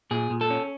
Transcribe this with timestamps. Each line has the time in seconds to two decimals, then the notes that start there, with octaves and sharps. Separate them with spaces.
0.11 A#2 G#4
0.30 A#2
0.41 A4
0.50 C#4